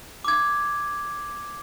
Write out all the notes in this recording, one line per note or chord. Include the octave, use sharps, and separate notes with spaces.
D6 G#6